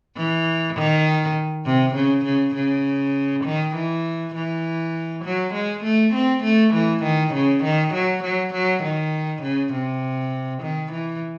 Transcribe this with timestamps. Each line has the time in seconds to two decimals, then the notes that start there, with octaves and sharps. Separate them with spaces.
0.16 E3
0.75 D#3
1.65 C3
1.95 C#3
2.25 C#3
2.55 C#3
3.44 D#3
3.75 E3
4.35 E3
5.24 F#3
5.54 G#3
5.84 A3
6.13 C4
6.44 A3
6.74 E3
7.03 D#3
7.34 C#3
7.63 D#3
7.94 F#3
8.23 F#3
8.53 F#3
8.83 D#3
9.43 C#3
9.73 C3
10.62 D#3
10.92 E3